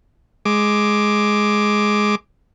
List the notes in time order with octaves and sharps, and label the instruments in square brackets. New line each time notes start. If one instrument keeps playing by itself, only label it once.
[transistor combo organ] G#3 D6